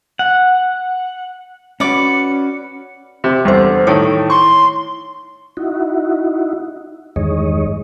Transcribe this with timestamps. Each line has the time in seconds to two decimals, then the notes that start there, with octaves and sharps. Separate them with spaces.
0.19 F#5
1.80 C#4 F#4 B4 D5 D6 C#7
3.24 C3
3.45 E2 D3 G3 C5
3.87 A2 D#3 E4 C#5
4.30 C6 C#6
5.57 D#4 E4 F#4
7.16 E2 G2 D#3 G#3 C#5 D#5